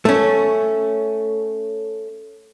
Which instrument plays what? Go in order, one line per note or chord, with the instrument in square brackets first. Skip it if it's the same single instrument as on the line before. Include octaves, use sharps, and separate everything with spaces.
[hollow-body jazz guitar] A3 C#4